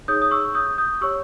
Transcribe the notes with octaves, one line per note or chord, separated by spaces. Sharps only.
D#4 G#4 C#5 D#6 G6
D#6
C#6 E6
D#6 G6
D#6 G6
G4 C#5 C#6 E6